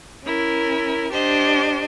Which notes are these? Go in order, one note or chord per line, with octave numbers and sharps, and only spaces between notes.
C#4 E4 A#4
D4 G4 C5 D#5